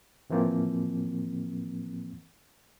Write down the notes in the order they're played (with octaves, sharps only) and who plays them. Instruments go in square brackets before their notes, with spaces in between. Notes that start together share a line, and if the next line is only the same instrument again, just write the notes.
[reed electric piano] A2 E3 F3 A#3 C4